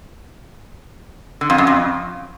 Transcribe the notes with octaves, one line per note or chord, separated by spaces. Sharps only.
D3
F2
F#2
F2